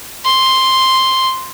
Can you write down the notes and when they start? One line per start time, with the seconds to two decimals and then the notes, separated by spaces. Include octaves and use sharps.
0.25 C6